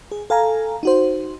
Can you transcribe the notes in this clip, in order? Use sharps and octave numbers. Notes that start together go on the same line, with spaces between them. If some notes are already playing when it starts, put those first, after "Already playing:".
G#4
A4 F5 G#5 A#5
D#4 F#4 C5